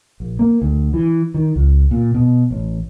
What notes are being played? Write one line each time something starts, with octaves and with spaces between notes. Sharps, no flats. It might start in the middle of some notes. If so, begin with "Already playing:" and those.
A#1
A#3
D2
E3
D#3
C#2
A#2
B2
A1